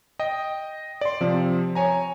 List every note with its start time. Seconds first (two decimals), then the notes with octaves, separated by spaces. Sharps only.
0.19 D#5 G5
1.01 D5 C6
1.20 C3 F3 C4
1.75 C#5 G#5 A#5